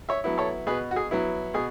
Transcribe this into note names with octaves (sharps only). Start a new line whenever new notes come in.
C#5 E5
F#3 B3 E4
A4 C#5
B2 G#4 B4
F#4
G#4
F#3 B3 E4
B2 G#4